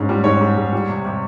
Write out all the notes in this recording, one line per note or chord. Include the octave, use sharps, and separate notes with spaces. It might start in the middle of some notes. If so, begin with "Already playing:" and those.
Already playing: G#2 C#4
G3
G#2 C#5
G#2
G#2
G3
C3
C3